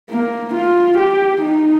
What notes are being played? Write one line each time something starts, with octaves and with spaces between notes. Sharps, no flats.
A#3
F4
G4
D#4